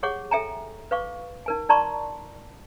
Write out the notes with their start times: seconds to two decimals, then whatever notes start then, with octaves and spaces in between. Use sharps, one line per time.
0.03 G4 G#4 C#5 F#5 C#6 D6
0.31 A4 E5 G5 G#5 A#5
0.91 B4 F5 C#6 D6
1.46 D#4 A#4 G#5
1.69 D#4 D5 A5 A#5 C6 C#6